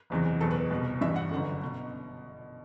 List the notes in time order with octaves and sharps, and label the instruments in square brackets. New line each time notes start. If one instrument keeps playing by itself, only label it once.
[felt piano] F#1 E2 C3 E3
F#1 E2 B2 A4
B4
C2 B2
A1 G2 E3 E5
F#5
G1 F#2 D3
B2